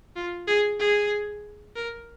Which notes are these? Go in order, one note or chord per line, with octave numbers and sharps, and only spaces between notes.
F4
G#4
G#4
A#4